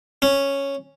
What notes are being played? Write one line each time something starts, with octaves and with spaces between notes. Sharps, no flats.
C#4